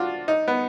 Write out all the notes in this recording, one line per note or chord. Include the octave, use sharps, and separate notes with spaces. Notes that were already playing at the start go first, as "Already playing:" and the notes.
Already playing: D4 F4 F#4
D#4
B3